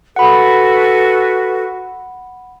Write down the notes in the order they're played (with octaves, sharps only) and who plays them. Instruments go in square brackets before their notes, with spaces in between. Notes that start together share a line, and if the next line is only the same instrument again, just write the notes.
[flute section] F#4 A4 B4 [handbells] F#5 B5